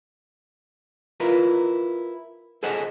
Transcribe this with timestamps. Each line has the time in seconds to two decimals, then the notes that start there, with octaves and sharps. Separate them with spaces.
1.20 E4 F4 A#4 B4
2.63 G#4 A4 C5 D#5 F#5 G#5